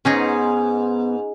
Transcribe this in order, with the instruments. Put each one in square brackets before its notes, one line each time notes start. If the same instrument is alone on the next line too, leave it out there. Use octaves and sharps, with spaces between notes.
[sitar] G#2 [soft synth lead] B3 [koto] C#4 D#4 G#4